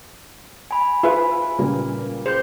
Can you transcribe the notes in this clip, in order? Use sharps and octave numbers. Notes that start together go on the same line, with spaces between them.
G#5 B5
F4 G#4 B4 E5
A#2 C#3 G3 A#3 B4
G#4 C5 G6